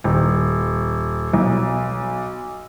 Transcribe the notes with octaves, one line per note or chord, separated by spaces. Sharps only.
D#1
B1